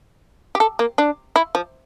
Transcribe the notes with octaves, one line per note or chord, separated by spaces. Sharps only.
G4
A4
A#3
D4
E4
F3